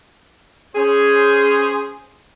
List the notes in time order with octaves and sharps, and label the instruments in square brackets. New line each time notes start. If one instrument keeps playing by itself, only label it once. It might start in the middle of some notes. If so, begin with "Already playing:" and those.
[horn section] C#4 G#4 C5